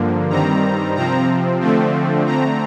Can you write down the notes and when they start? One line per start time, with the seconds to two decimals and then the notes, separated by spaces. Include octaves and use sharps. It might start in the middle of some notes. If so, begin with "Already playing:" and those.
Already playing: G2 D3 F3 A#3
0.30 G2 D#3 G3 C4 A#5
0.95 C3 F3 C4 A#5
1.61 D3 F3 A3 C4
2.26 D3 A3 C4 A#5